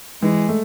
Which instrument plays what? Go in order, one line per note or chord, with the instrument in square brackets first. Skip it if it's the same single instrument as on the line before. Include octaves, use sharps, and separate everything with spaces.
[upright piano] E3 [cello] G#3
[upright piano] A3